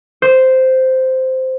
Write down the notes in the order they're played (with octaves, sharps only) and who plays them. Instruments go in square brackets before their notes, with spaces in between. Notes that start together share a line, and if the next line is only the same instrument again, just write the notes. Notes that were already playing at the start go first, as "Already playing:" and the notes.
[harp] C5